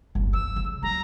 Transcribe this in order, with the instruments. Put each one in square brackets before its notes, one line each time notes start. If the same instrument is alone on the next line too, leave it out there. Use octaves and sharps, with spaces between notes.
[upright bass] G1 F#2
[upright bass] F3 [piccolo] E6
[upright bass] C#3
[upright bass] F#3 [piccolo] A#5